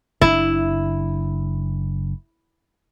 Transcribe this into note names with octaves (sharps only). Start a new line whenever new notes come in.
F#1 C#3 D4 E4